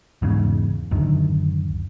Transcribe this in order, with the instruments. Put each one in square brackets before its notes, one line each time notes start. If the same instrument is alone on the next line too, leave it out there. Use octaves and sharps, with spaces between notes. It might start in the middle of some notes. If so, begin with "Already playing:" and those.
[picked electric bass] E2 G#2 C#3
D1 F#2 D3 D#3